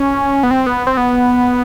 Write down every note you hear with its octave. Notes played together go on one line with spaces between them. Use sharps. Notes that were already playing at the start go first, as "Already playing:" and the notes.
Already playing: C#4
B3
C4
B3
C4
B3